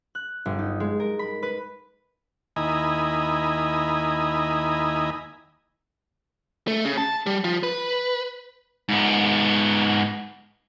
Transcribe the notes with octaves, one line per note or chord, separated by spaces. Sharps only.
F#6
G1
D#4
G#3
A#4
B5
B4
D#2 E4 D#5 G#5 A#5 B5
A3
C#3
A5
G3
F3
B4
G#2 B3